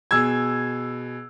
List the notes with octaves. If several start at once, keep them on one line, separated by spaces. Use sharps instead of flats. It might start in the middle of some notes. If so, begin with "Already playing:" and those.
B2 G#4 E6 G#6